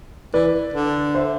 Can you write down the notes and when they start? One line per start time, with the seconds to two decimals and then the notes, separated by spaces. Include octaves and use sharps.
0.34 E3 B4 D5
0.74 D3
1.14 C5 E5